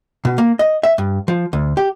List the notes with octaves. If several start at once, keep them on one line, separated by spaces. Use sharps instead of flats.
B2
A#3
D#5
E5
G2
F3
D2
G4